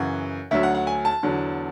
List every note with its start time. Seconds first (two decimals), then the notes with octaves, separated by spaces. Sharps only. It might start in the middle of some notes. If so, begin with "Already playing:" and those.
Already playing: F#2 C#3 E3 F#5
0.51 D2 D3 F#3 E5
0.63 F#5
0.75 F#5
0.87 G#5
1.05 A5
1.23 E2 D3 F#3